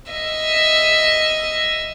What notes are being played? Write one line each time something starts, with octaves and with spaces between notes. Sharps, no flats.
D#5 E5